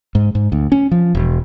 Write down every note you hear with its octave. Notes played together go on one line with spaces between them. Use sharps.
G#2
G#2
D2
C#4
F3
E1